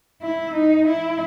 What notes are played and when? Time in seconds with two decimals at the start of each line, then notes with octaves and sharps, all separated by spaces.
0.22 E4
0.54 D#4
0.87 E4